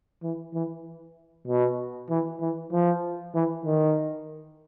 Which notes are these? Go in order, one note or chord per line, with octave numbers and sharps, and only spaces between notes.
E3
E3
B2
E3
E3
F3
E3
D#3